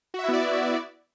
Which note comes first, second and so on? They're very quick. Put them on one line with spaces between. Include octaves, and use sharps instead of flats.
F#4 E5 E4 B3 D5